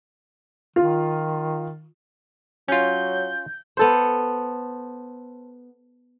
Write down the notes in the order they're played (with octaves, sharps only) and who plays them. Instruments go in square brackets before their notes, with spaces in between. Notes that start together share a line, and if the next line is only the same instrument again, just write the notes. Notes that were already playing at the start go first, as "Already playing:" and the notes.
[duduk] D#3 [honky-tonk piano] F4
[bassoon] F#3 [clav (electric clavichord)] C#4 F4 [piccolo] G6
[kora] B3 A4 C5